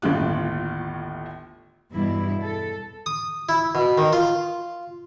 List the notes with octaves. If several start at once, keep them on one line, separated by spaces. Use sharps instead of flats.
G1 D#2 A2 F4 F#6
E2 G2 B2 E4
A4
D#6
E4
B2
D#3
F4